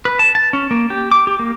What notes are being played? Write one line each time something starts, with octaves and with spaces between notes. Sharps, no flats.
B4
A5
A5
C#4
A#3
G4
D6
G4
A#3